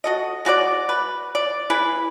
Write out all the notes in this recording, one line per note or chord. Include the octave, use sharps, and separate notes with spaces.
F#4 A4 D#5
G#3 F#4 B4 D5
B4
D5
E4 G#4 B4